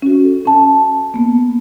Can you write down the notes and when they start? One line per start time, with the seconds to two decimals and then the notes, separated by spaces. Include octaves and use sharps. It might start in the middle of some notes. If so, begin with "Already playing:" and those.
0.02 C#4 F#4
0.24 A4
0.45 C#4 A5
1.14 A#3 B3